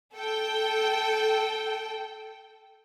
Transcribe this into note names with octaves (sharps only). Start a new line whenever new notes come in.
A4 G5